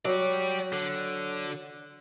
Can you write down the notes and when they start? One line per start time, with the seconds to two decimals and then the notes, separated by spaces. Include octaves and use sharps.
0.05 F#3 G4 D5
0.72 D3